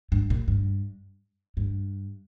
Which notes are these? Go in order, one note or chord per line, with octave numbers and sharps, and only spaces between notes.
G2
A#2
G2
G2